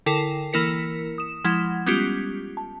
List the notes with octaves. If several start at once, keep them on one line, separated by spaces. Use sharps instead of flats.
D3 E4 A4 A#4 G5 C7
E3 A#3 E4 A#4 B6 C#7
D#6 E7
F3 G#3 E4 F#5 G#6
G3 G#3 B3 C#4 F4 G4
A5